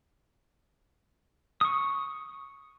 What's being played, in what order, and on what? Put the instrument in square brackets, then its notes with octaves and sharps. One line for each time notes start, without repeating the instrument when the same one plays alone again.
[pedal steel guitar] C#6 D#6